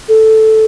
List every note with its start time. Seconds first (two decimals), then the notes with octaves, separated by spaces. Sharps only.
0.09 A4